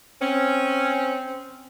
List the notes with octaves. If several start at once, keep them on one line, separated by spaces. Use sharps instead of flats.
C4 C#4